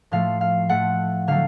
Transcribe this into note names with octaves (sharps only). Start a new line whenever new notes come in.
A2 F3 A3 F5
F5
A2 F3 A3 F#5
D3 F#3 A3 F5